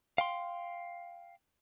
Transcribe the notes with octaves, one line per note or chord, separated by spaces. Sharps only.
F5 G5 C6